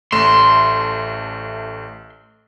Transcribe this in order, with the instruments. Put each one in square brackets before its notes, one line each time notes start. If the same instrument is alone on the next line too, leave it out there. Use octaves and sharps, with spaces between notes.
[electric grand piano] A1 A3 E7 [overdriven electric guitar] C6